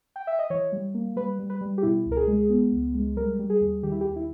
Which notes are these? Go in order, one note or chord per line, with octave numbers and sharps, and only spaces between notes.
G5
E5
D#5
E3 C#5
G3
A#3
G3 B4
G3
B4
G3
G4
B2 E4
C#2
A#4
G#4
G#3
B3
C#2
G#3
G3 A#4
G3
G#4
D#2
D#3 G4
E4
G4
D#2
E4